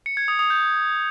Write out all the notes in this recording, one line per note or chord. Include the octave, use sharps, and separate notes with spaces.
C#7
G#6
D#6
D#6
G6